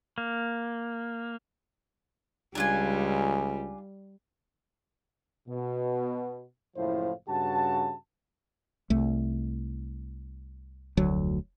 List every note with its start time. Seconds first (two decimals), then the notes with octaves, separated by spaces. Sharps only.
0.18 A#3
2.55 C#2 G3 D4 F4 G#5
5.49 B2
6.77 F#1 A2 F3 E4 C5 F5
7.28 G2 C#3 F#4 A5
8.90 C2 A3
10.97 F1 D2 F#3